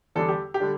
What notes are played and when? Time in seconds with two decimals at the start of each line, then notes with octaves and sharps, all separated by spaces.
0.16 E2 D3 G3 D4 A4
0.29 G4
0.54 G4
0.60 D3 G3 D4